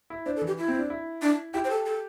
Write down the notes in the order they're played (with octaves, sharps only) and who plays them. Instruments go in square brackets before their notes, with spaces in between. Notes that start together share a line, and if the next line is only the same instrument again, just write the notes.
[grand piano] E4
[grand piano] D4 [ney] C5
[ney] A4
[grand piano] E3
[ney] G4
E4
[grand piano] C4
D4
E4
[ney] D4
[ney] E4 [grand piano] G4
[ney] C5
A4
A4